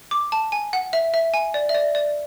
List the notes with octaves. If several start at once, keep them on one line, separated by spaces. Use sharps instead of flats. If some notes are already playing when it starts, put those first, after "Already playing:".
D6
A5
G#5
F#5
E5
E5
G#5
D5
E5
D5
D5